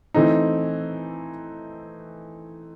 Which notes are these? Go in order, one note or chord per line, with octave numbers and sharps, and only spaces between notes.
E3 A3 C4 D#4